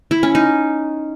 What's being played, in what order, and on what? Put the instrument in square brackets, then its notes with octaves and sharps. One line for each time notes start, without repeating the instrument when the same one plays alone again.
[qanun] E4
C#4
D#4